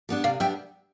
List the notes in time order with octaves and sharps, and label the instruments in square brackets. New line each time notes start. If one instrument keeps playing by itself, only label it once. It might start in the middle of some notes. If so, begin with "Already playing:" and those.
[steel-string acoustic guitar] G3 B3 D4
[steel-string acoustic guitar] C3 [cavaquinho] D5 F5
[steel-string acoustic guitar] G3 B3 D4 [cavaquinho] E5 G5